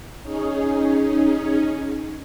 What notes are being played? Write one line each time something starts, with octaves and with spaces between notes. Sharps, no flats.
C#4 D#4 G#4